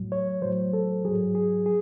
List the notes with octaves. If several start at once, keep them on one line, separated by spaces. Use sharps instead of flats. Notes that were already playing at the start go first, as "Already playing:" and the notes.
Already playing: A2 F#3
C#5
A2 F#3 C5
A4
G#2 F#3 G#4
G#4
G#4